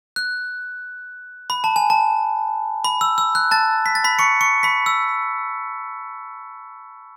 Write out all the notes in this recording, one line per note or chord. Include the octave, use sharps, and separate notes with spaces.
F#6
B5
A5
G#5
A5
B5
E6
E6
F#6
A5 A6
B6
A6
B5 B6
C#6 C#7
C#6 C#7
B5 B6
E6